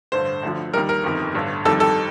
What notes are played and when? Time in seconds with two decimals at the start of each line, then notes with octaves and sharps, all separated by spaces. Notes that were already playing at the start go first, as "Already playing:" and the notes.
0.12 A1 G2 D3 C5
0.43 D2 D3 F3
0.73 D#2 D#3 G3 A#4
0.89 A#4
1.04 G1 F2 D#3
1.35 A1 G2 D3
1.65 F2 D#3 G3 A4
1.80 A4